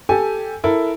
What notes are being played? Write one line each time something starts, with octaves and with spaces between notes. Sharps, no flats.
G4 A4 G#5
E4 A4 A#4